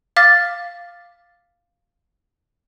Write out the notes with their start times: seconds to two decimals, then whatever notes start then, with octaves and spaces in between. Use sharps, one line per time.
0.16 F5 D6 F6 A6 B6